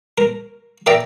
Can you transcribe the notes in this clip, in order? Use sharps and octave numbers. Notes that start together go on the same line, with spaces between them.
A#4
A#4 D5 E5 G5 A#5